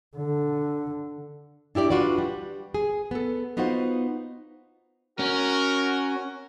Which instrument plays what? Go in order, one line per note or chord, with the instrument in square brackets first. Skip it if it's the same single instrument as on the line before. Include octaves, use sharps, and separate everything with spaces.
[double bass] D3
[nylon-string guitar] D4 E4 G4 D5
D4 F4 F#4 B4 D5
G3
G#4
B3 A4
B3 D#4 F4 F#4 C5 F#5
[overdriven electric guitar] C#4 [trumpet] F#4 [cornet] A#4